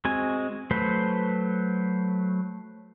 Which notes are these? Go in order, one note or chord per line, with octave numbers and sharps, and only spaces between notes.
G#3 C4 F#4 G#5
F#3 A3 B4 C5